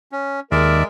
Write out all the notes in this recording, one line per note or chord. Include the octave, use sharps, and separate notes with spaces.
C#4
D#2 G#3 A#4 D5 E5